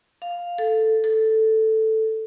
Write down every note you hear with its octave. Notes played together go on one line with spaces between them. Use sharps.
F5
A4
A4